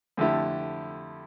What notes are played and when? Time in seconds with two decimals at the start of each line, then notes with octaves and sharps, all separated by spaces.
0.17 F2 D3 A3 E4 G4